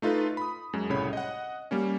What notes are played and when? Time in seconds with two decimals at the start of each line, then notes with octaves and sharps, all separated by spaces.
0.02 A3 D#4 F4 A4 B4
0.37 B5 D#6
0.73 F#2 G#3
0.90 C2 A2 C#3 C#5 B5
1.13 D#5 F#5
1.71 G3 A#3 C#4